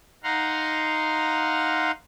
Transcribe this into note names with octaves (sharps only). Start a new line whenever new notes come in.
D#4 F5 F#5 A#5 C6